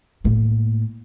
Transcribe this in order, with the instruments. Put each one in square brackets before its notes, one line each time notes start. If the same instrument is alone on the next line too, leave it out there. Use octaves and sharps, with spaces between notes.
[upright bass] A2 A#3